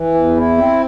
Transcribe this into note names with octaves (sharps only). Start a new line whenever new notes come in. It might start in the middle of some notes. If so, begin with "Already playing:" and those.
Already playing: E3
E2
E4
C4